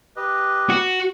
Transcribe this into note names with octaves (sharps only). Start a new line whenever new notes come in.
G4 B4 D#5
F#4